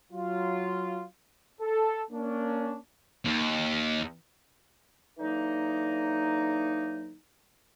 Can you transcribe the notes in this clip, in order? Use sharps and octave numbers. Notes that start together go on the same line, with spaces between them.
F#3 F4
A4
A#3 C#4 D4
D#2
D3 E3 F#3 A#3 D#4